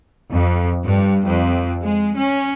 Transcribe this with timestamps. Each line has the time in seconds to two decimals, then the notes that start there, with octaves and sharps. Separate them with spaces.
0.31 F2
0.83 G2
1.25 F2
1.83 G#3
2.16 C#4